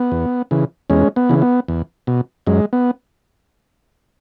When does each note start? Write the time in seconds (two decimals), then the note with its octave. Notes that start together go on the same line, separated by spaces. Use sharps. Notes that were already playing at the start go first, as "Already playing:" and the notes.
Already playing: B3
0.12 E2
0.51 C#3 E3
0.90 E2 G#3 C#4
1.16 B3
1.29 C#3 E3
1.42 B3
1.68 E2
2.07 B2
2.47 F#2 G#3
2.73 B3